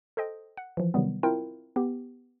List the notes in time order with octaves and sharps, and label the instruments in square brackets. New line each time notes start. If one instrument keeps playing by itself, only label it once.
[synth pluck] A4 C5 D#5 G5
F#5
E3 F3
C3 D#3 F#3 G3 B3
C4 E4 F4 A#4 G5
B3 G4